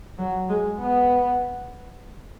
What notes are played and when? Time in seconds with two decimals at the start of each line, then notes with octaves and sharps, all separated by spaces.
0.18 F#3
0.49 G#3
0.80 B3